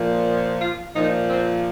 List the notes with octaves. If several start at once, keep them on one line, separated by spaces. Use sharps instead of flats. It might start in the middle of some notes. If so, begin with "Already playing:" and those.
Already playing: A#2 F3
F4
A#2 F3 D#4
C4